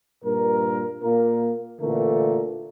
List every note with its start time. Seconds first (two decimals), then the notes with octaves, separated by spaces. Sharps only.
0.24 G2 A#2 A#4
1.03 A#2 A#3 A#4
1.80 A1 A#2 D3 E3 A3 A#4